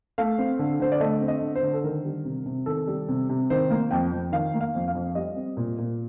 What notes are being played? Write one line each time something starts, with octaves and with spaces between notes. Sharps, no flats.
A3 F5
C4
D3
D3 C5
D5
A3 D#5
C4
D#5
D3
C5
D3
A4
D#3 A#4
G3
C3
C3
D#3 A4
G3
C3
C3
D#3 C5
A#3
F2 G5
F2
D#3 F5
A#3
F5
F2
F5
F2
G3 D#5
C4
A#2
A#2